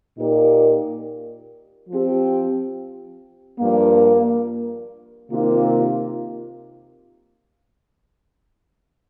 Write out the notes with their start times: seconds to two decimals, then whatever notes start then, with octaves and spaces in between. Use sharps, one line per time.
0.18 A#2 A#3 D#4 G4 A#4
1.89 F3 C4 G4
3.59 G2 F3 A#3
5.29 C3 D#3 A#3 F4